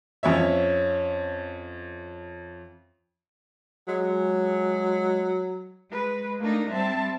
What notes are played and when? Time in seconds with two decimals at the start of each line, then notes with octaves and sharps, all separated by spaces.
0.23 F2 C#4 C#5 E5
3.88 F#3 G#3
5.92 G#3 B4
6.40 A3 A#3 D4 D#4
6.69 G3 C4 E5 A5